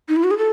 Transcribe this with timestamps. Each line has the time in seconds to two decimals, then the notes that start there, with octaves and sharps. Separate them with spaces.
0.09 D#4
0.16 E4
0.24 F#4
0.31 G#4
0.38 A4